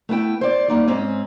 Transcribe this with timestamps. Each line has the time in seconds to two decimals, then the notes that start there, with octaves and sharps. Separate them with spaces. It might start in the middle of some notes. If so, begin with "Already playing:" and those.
0.09 A3 B3 E4 G5
0.41 C5 D5
0.68 G3 A#3 D#4 D5
0.88 G#2 C4 C#4